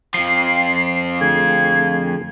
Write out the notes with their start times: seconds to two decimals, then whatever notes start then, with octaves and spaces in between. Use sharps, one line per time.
0.14 F2 F3 C7
1.21 D3 A3 G#4 G#6